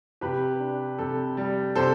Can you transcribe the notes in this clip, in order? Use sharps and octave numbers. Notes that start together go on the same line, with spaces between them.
C3 G4 B4
D4
C3 A4
G3
C3 A4 C5